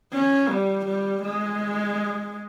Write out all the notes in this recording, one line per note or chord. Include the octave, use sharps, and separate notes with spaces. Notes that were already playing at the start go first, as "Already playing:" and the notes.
C#4
G3
G3
G#3